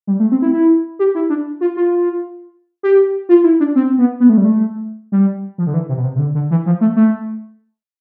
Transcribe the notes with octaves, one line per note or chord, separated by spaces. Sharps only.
G3
A3
C4
E4
E4
G4
E4
D4
F4
F4
G4
F4
E4
D4
C4
B3
B3
A3
G3
A3
G3
F3
D3
E3
C3
B2
C3
C3
D3
D3
E3
F3
A3
A3